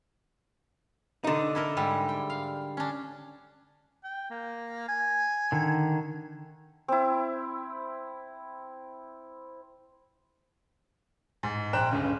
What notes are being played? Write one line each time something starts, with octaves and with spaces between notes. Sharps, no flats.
D3 D#4
E4 A4 A#4
G#2 G3
G5
F5
C#4 D4
G5
A#3
G#5
D3 D#3
C4 E4
G#2
A#1 C5 G5 A#5 F#6 E7
G1 C#2 C#3